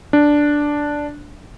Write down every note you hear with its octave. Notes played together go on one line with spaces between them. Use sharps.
D4